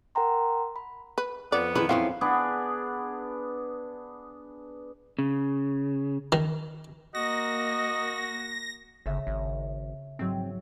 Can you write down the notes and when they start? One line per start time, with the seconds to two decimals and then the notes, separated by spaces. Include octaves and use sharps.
0.15 A#4 F#5 G5 A#5 C6
0.76 B5
1.18 B4
1.52 F2 B3 D5
1.75 D#3 E4 G#4 B4
1.89 F#2 F3 C4 C#4 E4 F5
2.21 B3 D4 G#4
5.19 C#3
6.32 D#3
7.15 A#3 F#4 D#5 A#6
9.06 G1 C#3 E5
9.27 G#1
10.19 G#2 F#3 C4